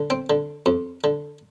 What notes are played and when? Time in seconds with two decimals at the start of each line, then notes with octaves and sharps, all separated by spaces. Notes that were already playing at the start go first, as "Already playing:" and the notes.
Already playing: D3
0.10 C4
0.30 D3
0.66 F2
1.04 D3